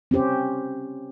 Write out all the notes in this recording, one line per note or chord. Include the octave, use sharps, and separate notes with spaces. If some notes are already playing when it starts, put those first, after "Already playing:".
C4 C#4 G4 C5